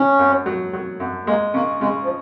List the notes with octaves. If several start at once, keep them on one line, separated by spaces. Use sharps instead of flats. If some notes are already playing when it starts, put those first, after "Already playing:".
Already playing: C#3 C#4
F#2
F#3
F#3
F#2
G#3 A#3
C#3 A#3
C#3 G#3
F3